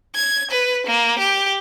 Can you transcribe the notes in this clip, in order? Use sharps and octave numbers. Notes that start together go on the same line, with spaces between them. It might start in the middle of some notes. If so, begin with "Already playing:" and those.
G#6
B4
A#3
G4